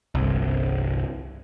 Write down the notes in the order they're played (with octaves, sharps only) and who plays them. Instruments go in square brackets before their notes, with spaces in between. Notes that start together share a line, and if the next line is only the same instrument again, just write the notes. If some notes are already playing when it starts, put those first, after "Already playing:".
[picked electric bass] G1 C2